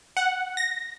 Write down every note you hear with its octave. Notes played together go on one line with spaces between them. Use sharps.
F#5
A#6